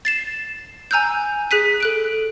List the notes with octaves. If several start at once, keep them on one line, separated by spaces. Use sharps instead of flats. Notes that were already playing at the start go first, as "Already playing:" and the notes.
A6 C7 E7
G#5 A#5 E6 F#6 G6
G#4 F#6 B6 D#7
A4 F#6 D7